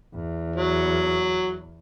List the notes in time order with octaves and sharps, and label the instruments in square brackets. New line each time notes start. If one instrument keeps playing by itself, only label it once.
[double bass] E2
[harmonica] F#3